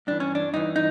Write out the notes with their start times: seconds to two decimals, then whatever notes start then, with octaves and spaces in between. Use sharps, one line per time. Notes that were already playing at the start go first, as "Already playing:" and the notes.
0.07 G2 E3 D4
0.20 C#4
0.35 D4
0.53 G2 E3 D#4
0.76 D#4